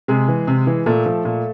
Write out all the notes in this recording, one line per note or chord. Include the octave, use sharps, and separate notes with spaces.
C3 G#3 G#4
E3
C3
E3
A#2 A3 A4
F3
A#2